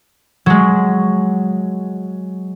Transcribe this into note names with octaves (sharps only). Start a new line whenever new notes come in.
F#3 G#3